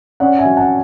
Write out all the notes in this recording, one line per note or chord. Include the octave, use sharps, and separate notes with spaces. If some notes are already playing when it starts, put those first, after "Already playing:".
C#4 D5 F#5
E5 G#5
F#3
F#5 A5